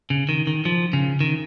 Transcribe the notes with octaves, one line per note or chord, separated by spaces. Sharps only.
C#3
D#3
D#3
F3
C#3
D#3